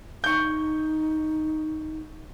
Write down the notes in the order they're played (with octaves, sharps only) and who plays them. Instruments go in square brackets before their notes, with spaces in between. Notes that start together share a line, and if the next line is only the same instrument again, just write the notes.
[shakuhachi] D#4 [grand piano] C#6 G6